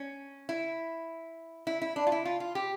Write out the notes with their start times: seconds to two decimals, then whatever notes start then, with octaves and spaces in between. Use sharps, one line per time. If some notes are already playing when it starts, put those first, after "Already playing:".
Already playing: C#4
0.49 E4
1.67 E4
1.82 E4
1.96 D4
2.07 F4
2.12 E4
2.25 F4
2.40 F4
2.55 G4